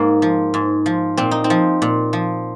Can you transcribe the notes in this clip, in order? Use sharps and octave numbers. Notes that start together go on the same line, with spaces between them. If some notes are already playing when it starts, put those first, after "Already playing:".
Already playing: G#2 A#3
F3
G#2
F3
A#2 C4
D#4
C4
F3
A#2
F3